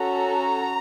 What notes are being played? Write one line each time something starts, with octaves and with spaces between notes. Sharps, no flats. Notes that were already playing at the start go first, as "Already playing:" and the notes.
Already playing: C#4 F#4 A4 A#5